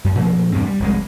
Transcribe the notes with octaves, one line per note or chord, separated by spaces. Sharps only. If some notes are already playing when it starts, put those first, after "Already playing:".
F#2
A#2 F3 A3 A#3
E2 G2 C3 C4
G3
F1 C2 G#3